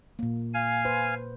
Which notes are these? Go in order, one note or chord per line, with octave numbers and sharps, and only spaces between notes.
A#2 A#3
F5 G#5
B4 C5